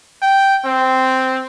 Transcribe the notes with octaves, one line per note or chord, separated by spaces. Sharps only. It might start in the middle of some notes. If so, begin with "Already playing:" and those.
G5
C4